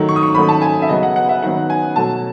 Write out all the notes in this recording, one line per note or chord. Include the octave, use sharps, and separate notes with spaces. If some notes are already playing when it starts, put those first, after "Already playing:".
Already playing: D#3 F#3 A3
C#6
D#6
C#6
D#3 F#3 A3 B5
A5
G#5
E5
C#3 F#3 B3 D#5
F#5
F#5
E5
D#3 F#3 B3 F#5
G#5
B2 F#3 A3 A5